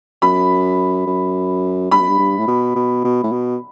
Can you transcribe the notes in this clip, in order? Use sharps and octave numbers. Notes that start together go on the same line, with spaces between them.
F#2 B5
F#2
G2 B5
F#2
G2
G2
A2
B2
B2
B2
A2
B2